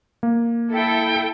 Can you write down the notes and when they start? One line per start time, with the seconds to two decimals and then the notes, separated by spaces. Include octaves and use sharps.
0.23 A#3
0.73 E4 A4 G5